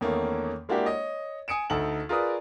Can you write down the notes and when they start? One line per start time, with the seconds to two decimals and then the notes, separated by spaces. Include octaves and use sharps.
0.01 E2 D#3 A3 A#3 C#4
0.69 G#3 A#3 D4 E4 F#4 G4
0.86 C#5 D#5
1.48 G#5 D#6 C#7 D7 E7
1.70 D2 D#4 A4 F#7
2.09 F4 G#4 A#4 B4 D5 D#6